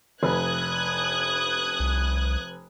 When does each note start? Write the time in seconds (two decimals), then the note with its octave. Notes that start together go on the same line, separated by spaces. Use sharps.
0.23 F1 B4 D#6 F#6 G#6
1.80 C2